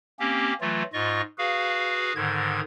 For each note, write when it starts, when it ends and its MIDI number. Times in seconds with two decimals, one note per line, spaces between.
0.20 0.54 58
0.20 0.54 60
0.20 0.54 61
0.20 0.54 67
0.61 0.83 52
0.61 0.83 54
0.61 0.83 57
0.61 0.83 65
0.93 1.21 44
0.93 1.21 65
0.93 1.21 75
0.93 1.21 85
1.38 2.13 66
1.38 2.13 68
1.38 2.13 71
1.38 2.13 77
2.15 2.61 44
2.15 2.61 50
2.15 2.61 51
2.15 2.61 92